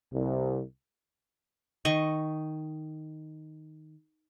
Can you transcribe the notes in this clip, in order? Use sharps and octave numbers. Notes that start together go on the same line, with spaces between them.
C2
D#3 D#5 C#6